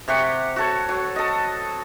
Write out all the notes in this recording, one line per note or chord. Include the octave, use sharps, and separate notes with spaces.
C3 G4 F#5 C#6
F#4 A4 C#5
F#3
A4 D#5